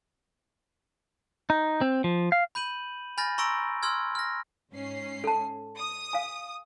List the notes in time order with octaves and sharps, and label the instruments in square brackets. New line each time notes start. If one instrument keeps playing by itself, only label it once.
[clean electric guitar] D#4
C4
F3
F5
[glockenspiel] B5 G6 D#7 F#7
G#5 B5 F6 G6 A6 A#6
A#5 C6 C#6 E6 A#6 D7
C6 E6 F6 G#6
F6 A#6
[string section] G#2 C#4 C7
[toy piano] A4 A5
[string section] D#6
[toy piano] F5 G#5